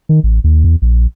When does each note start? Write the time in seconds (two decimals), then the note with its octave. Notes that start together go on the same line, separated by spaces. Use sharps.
0.09 D#3
0.24 A1
0.44 D#2
0.64 E2
0.82 A#1